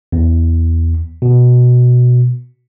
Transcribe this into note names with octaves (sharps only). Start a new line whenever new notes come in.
E2
B2